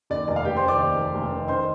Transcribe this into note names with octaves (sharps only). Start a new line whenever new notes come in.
D#2 D5
F1 D5
F5
F1 G4 G5
C5 C6
D#3
D5 D6
D#2
F1
F1
D#3
D#3 C5 C6